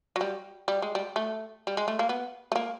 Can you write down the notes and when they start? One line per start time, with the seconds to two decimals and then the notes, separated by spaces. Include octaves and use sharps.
0.16 F#3
0.21 G3
0.68 G3
0.82 G#3
0.95 G3
1.16 A3
1.67 G3
1.77 G#3
1.88 A3
1.99 A#3
2.09 B3
2.52 A3
2.56 A#3